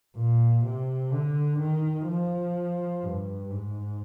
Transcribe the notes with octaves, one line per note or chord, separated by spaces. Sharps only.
A#2
C3
D3
D#3
F3
G2
G#2